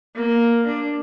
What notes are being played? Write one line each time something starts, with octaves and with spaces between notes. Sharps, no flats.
A#3
D4